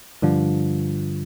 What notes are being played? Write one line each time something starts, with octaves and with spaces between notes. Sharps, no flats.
G2 D3 F3